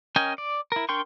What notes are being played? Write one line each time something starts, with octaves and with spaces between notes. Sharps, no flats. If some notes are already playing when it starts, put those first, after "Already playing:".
C#4 A#4 D#5 G5 G#5
D5
E4 A#4
D4 A#4 G5 C6 C#6